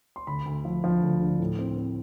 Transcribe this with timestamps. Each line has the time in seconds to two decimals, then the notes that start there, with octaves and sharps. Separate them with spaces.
0.16 C6
0.27 D2 B5
0.46 D2
0.65 F3
0.84 F3
1.02 D2
1.21 D3
1.40 A2
1.59 C4
1.78 C4